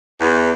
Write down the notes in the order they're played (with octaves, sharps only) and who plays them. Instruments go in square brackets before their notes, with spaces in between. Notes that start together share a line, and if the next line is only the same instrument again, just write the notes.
[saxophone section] E2